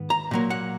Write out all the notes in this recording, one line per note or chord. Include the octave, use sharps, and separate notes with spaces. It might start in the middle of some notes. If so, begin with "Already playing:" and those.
Already playing: G#2 D#3 B3
A#5
A#2 F#3 A#3
F#5